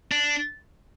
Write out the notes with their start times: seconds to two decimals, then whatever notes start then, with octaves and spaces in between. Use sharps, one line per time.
0.11 D4